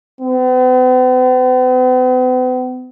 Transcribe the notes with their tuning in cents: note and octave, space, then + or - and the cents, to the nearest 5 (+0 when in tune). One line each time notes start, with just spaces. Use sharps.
B3 +45